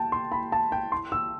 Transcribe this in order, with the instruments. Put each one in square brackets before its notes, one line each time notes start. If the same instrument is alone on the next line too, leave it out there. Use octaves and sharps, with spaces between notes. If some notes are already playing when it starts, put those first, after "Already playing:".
Already playing: [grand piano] G5 A5
C6
B5
A5
G5
C6
E6